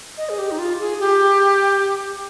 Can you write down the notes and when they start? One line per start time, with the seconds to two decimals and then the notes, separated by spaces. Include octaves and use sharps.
0.18 D#5
0.29 G#4
0.38 G4
0.51 D#4
0.59 F4
0.79 G#4
1.00 G4